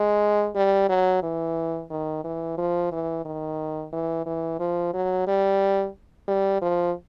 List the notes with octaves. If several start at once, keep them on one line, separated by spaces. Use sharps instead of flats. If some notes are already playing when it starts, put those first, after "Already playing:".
Already playing: G#3
G3
F#3
E3
D#3
E3
F3
E3
D#3
E3
E3
F3
F#3
G3
G3
F3